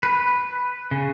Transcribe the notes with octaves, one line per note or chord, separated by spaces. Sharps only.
B4
C#3